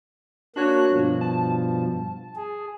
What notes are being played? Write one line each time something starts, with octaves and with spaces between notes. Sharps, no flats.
A#3 D4 F#4 C#5 F#6
G2 B2 F3
A5
G#4